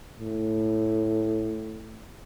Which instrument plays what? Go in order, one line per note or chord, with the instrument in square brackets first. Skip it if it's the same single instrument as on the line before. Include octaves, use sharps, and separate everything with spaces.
[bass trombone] A2